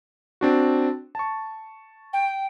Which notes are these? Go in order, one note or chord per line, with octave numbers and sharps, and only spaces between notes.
C4 D4 F#4
A5 C#6
G5